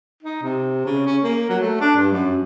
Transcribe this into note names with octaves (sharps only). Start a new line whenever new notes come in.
D#4
C3
C#3
C#4
A#3
F#3
A3
D4
G2
F#2